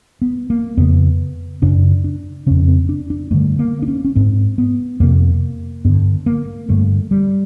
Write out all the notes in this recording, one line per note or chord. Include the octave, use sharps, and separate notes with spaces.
B3
A#3
F2 C#3 B3
F#2 C#3 D4
D4
F2 C#3 C#4
C4
D4
D4
G2 D3 A3
A#3
D4
C#4
C#4
G#2 C4
B3
F2 C3 A#3
G2 D3 B3
A#3
G2 D3 A3
G3